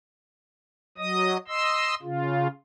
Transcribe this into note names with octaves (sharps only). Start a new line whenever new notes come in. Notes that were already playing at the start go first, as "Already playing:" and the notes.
F#3 D#5 D#6
D#5 C6 E6
C#3 F4